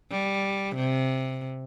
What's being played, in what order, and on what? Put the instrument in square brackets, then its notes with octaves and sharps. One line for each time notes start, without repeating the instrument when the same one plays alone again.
[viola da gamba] G3
C3